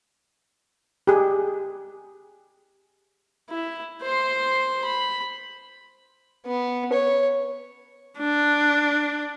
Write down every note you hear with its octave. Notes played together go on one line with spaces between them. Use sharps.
G4 G#4
E4
C5 C6
B5
B3
C#5
D4